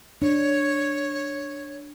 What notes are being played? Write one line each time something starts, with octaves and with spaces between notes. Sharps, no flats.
D4 C#5